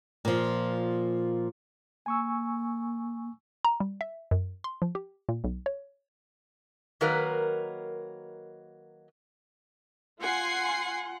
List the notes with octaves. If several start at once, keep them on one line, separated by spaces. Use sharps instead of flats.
A#2 F3
A#3 G#5 C#6 E6
A#5
G3
E5
F#2
C6
F3
G4
A#2
B1
C#5
D#3 F#3 A#3 A#4 B4
F4 F#5 G#5 C6 C7